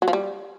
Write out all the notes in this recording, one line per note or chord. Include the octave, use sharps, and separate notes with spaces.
F#3
F3
G3